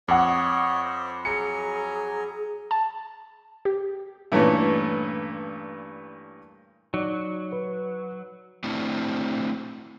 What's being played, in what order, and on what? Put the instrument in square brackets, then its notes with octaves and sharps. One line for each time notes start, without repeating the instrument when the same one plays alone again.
[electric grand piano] F2 [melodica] C#5 D#5 [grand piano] F#5 D6
[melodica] C5
[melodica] F#3 G#5 A#5 [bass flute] G#4 [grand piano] C#7
[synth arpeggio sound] A5
G4
[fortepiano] G2 A#2 E3 A3 C#4
[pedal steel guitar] F#3 [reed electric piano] D#4 D5
[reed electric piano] B4
[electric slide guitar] A3 C4 D4 E4 G4